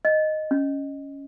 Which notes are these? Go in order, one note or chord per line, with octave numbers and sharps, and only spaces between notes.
D#5
C#4